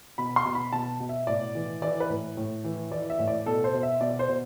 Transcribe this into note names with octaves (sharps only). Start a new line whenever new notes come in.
B2 B5
C6
B2
B5
B2 A5
B2
E5
A2 D5
E3
E3 D5
B4
A2
A2
E3
E3 D5
E5
A2
D5
B2 A4
C5
B2
E5
B2 D5
C5
B2